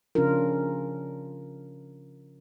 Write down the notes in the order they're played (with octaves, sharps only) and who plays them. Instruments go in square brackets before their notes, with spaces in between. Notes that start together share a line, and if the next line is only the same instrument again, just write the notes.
[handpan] C#3 F3 C#4 D4 F4 A#4